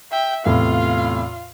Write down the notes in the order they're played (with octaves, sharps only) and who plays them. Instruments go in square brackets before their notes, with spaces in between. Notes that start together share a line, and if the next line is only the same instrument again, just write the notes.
[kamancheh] E5 G5
[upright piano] E2 A2 C3 [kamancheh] F4 F5